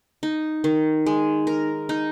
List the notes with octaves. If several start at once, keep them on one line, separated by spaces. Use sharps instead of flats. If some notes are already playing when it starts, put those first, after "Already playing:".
D#4
D#3
G#3
A#4
D#4